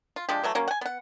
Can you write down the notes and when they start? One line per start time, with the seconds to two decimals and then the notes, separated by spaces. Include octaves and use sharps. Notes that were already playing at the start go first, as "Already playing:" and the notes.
0.16 F4
0.29 F3 G#3 D4 G4
0.43 E3 F#3 A3
0.55 F#3 A#3 C#4
0.68 F#5 G#5
0.81 B3 F#5